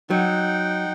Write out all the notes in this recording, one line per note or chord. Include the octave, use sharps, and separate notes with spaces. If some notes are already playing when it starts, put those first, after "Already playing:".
F#3 D#4 F#5 G5